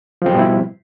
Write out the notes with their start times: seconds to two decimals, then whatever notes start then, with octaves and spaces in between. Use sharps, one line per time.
0.22 F3
0.26 C4
0.30 G3
0.34 B2
0.39 E4